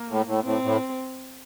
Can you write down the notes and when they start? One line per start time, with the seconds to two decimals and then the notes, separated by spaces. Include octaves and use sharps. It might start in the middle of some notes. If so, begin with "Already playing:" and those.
Already playing: A#3
0.09 A2
0.26 A2
0.44 A2 C4
0.63 A2